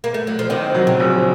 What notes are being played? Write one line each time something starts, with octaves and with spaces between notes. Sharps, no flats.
A#3
A3
F#3
F3
C3 D#3 C4
F#3
C#3
A#1